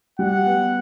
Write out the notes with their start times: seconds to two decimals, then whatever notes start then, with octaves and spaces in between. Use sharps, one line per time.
0.19 G3 F#5
0.46 B3